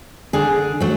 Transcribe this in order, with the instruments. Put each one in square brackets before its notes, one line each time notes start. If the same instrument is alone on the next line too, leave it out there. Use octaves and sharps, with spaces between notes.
[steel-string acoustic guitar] D3 G#4
F#3 A3 F#4